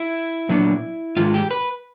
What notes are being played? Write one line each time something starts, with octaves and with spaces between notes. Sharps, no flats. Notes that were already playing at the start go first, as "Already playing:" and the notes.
Already playing: E4
A#2 F#3 B3 D4
G#2 D#3 G#3 F4
G4
B4